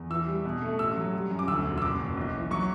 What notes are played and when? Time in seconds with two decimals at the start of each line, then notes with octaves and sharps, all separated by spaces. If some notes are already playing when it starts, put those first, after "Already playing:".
Already playing: E2
0.10 E3 E6
0.27 G3
0.45 B2
0.62 A3
0.78 A1 E6
0.96 F#3
1.13 G3
1.30 F#2
1.39 D6
1.48 D2 E6
1.65 E1
1.78 E6
1.82 F#1 D6
2.00 F#1
2.17 B1
2.35 E3
2.51 F#3 C#6